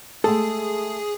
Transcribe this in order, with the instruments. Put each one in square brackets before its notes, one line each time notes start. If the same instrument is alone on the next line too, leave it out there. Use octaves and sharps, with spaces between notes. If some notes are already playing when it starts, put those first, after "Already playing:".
[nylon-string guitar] G#3 A3 G5 [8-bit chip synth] G#4 [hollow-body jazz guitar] A4